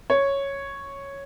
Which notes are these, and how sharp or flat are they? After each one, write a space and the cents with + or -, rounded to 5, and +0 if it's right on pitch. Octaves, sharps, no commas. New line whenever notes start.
C#5 -5